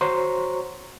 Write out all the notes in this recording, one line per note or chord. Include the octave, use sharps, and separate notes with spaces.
F#4 C5 C#5 A#5 C#6